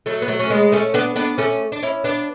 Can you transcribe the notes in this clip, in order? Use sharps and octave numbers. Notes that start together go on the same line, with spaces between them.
F#3 A3
B3
F#3 A3
C#4
G#3 B3
A3 C#4
B3 D4
B3 D4
A3 C#4
D4
C#4 E4
B3 D4